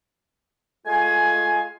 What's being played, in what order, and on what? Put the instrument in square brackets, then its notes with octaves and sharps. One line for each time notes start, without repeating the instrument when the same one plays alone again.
[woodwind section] G#3 A3 F4 F5 G#5